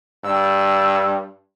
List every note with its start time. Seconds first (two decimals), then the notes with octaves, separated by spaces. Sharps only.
0.24 G2 E6